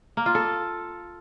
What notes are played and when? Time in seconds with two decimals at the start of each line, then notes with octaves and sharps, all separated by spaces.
0.17 A#3
0.26 F4
0.35 A4